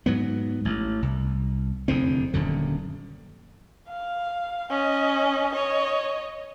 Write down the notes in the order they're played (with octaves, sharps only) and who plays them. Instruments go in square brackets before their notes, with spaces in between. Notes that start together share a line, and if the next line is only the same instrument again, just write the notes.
[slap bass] G#2 F#3 B3
A1
C2
F1 E2 D3 C4
D#1 F#2 D3
[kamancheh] F5
C#4 D#5
C#5 D#5